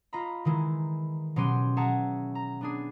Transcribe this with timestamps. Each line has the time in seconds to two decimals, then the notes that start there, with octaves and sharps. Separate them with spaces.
0.13 F4 D#5 A#5 B5
0.45 D#3 E3 G#3 E4
1.36 B2 F#3 C#4 G4 C6 D#7
1.77 G#4 C#5 E5 F#5 A5 A#5
2.35 A#5
2.61 B3 D4 G#4